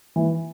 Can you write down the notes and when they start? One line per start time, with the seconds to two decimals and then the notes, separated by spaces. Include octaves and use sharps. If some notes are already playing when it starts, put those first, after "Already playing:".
0.16 E3